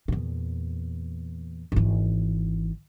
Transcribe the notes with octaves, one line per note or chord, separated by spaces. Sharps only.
E2 A#2
G#1 E3